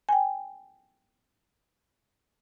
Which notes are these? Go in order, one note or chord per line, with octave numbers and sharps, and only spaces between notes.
G5 G#5